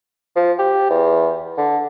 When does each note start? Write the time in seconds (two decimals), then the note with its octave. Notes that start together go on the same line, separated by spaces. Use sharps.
0.36 F3
0.59 G4
0.90 E2
1.58 D3